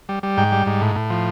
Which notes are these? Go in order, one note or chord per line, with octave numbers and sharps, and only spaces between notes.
G3
G3
G#2 G5
G3
G#2
A2
A2
F3